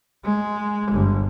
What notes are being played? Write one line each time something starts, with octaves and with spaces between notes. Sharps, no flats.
G#3
G1